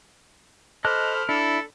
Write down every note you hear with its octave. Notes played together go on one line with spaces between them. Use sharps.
A4 C5 D#5 A5 B5 D6 F6 F#6
D4 E4 A4 B5